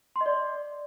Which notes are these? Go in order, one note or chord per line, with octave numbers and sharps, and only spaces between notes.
C6
D#5
D5